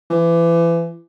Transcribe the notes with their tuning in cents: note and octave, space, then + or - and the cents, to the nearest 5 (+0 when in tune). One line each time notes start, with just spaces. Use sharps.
E3 +30